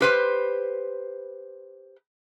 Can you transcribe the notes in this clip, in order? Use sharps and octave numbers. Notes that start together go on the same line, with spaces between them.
G4 B4 C5